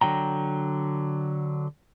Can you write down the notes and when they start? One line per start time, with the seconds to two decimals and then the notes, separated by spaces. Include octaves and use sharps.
0.01 D3 F#3 G5 A#5